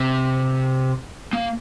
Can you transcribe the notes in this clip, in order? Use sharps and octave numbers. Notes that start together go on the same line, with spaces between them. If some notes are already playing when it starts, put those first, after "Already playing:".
Already playing: C3
A#3